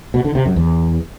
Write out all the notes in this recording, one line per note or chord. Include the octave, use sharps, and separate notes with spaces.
B2
D3
C3
F#2
E2